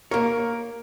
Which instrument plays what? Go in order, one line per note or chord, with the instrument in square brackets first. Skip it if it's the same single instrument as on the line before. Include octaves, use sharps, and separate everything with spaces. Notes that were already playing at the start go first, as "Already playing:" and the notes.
[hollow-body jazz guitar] A#3 C#5 [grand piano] A#4